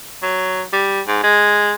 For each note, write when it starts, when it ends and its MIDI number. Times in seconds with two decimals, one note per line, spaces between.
0.22 0.62 54
0.73 1.01 55
1.07 1.21 44
1.23 1.74 56